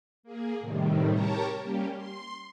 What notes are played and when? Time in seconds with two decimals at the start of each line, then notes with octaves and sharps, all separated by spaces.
0.23 A#3 G#4
0.60 A2 C3 D#3 G3
1.11 G4 A#4 C#5 A5 A#5
1.62 G3 A#3 C#4 G4
1.96 C6